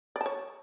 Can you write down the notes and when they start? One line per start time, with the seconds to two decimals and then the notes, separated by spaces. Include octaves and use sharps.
0.16 D5
0.21 A5
0.26 C#5